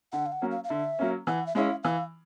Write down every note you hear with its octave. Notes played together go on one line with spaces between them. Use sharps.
D3 F#5
F5
F#5
F#3 A#3 C#4
F5
F5
D3 E5
F#3 A#3 C#4
E3 F#5
E5
G#3 C#4 E4 F5
E3 F5